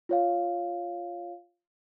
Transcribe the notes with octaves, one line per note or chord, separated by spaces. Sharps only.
F4 C#5 F5